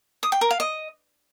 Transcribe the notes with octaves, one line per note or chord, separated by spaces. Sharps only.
D#6
G5
A#4
F5
D#5